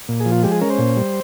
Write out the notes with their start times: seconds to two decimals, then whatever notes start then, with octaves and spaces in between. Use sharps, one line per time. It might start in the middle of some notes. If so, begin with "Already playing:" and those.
0.08 A#2
0.20 G#4
0.26 F3
0.32 F4
0.43 G#3 G4
0.52 G#4
0.61 C#4 A#4
0.70 C5
0.79 A#2
0.97 G3